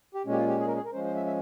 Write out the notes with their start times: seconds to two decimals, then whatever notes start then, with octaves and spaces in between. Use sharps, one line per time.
0.15 G4
0.25 A#2 G#3 C#4
0.32 G4
0.37 F4
0.48 G4
0.60 G#4
0.67 A#4
0.76 G#4
0.85 A#4
0.92 F3 G#3 C#4 C5
1.04 C5
1.16 E5
1.26 E5